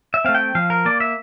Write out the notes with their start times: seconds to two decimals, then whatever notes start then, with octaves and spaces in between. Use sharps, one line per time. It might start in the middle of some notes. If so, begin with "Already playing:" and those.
0.14 E5
0.25 A3 C4 F5
0.35 G5
0.55 F3 F5
0.70 A#4
0.85 A#3 D5
1.00 E5